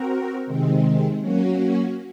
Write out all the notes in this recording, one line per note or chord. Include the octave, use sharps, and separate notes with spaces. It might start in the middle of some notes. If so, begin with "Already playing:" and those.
Already playing: C4 F#4 A#4
C3 D#3 G#3 C4
F#3 A#3 C#4 F#4